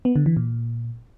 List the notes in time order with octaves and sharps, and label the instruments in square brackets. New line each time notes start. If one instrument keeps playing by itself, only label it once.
[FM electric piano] B3
D3
E3
A#2